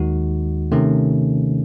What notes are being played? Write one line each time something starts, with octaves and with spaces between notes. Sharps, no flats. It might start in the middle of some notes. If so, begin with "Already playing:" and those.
Already playing: D#2 D#3 G#3 D#4 F#4
C3 D#3 A3 C#4